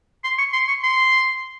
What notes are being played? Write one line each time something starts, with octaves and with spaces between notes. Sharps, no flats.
C6
C#6
C6
C#6
C6